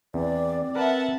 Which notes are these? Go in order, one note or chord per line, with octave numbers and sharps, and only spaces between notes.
E2 C4 D5
A#4 B4 E5 F#5 A5